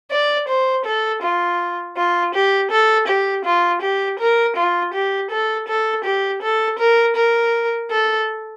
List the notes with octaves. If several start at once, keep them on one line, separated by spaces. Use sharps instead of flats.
D5
C5
A4
F4
F4
G4
A4
G4
F4
G4
A#4
F4
G4
A4
A4
G4
A4
A#4
A#4
A4